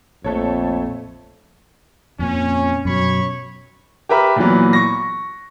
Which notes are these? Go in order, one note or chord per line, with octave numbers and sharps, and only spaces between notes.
A#1 F2 A3 A4 C#5
F2 A#2 C#4
F#2 B2 F#3 C#5 B5 C#6
G4 A#4 B4 E5
A#2 E3 F#3 B3
C#6 A#6